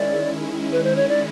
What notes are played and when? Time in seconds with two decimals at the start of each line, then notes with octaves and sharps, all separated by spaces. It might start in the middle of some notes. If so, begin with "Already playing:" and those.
Already playing: D#3 G#3 C#4 E4 D5
0.72 B4
0.84 C5
0.96 C#5
1.09 D5